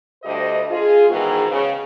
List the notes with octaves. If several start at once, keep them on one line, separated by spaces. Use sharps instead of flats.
D2 G2 G4 C5 D#5
F4 G#4
G#2 D#3 E3 B3 F#4 G#4
C#3